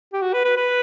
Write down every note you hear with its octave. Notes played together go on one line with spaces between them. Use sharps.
G4
F#4
B4
B4
B4